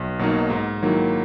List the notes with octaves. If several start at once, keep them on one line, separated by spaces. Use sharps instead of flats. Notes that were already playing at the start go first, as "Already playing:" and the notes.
Already playing: B1
B2 F#3 A#3 D#4
G#2
D#3 F#3 A#3 E4